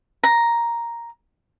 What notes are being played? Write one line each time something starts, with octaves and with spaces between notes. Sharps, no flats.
A#5